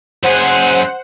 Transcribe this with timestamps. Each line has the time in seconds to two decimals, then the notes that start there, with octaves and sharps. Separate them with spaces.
0.23 F#2 G#4 C5 F#5